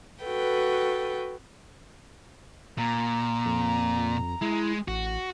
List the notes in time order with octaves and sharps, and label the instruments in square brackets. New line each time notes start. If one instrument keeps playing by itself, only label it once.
[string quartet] F#4 A4 B4 G5
[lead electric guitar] A#2 [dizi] A#5
[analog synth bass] F2
[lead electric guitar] G#3 [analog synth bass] E4
[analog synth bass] A1 [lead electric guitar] F#4